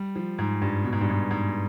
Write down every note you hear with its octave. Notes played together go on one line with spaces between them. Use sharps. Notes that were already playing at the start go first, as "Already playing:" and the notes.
Already playing: G3
F3
G#2
G2
B2
G#2
G2
G#2
G#2